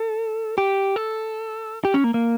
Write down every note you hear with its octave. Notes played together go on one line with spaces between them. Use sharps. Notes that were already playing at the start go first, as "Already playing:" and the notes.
Already playing: A4
G4
A4
G4
C#4
A#3
A#3